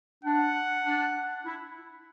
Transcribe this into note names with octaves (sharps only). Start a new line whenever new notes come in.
D4 F#5
D4
E4